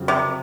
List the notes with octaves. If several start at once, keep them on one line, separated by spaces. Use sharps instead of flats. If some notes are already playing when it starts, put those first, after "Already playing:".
Already playing: F2 C#3 F#3 C4
C3